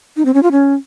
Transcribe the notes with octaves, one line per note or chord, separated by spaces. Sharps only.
D#4
C4
C#4
F4
C#4